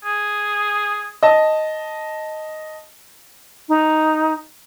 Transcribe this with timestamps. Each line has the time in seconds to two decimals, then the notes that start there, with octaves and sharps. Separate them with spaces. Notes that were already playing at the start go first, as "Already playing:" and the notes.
0.04 G#4
1.23 D#5 A5
3.69 D#4